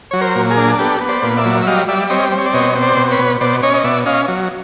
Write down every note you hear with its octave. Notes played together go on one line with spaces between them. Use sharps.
F#3 C#5
A#4 C5
A#2
G#4 A#4
D4
B3 G4 A4
B3
C5 D5
A#2
D5 E5
F#3
E5
G3 D#5 F5
G3 D5 E5
C4 C#5 D#5
C4
C#5
D5
B2 C#5 D#5
C4
C5 D5
B2
B4 C#5
B2
B2 C5 D5
C#4 C#5 D#5
D#5
B2 D5 E5
C#4 D#5 F5
F#3